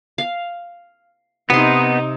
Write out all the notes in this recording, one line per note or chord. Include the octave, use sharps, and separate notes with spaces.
F5
C3 B3 D#4 C6